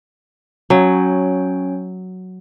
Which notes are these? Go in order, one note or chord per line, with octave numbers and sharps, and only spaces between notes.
F#3 C#4 C#5 G#5